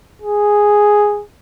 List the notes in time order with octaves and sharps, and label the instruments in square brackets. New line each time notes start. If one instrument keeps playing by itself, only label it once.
[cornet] G#4